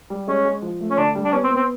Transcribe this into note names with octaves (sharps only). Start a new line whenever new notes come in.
G3
G#3 C#4
G#3
F3
A3
C#4
D3 D4
G3
D4
B3 C#4
C4
B3
C4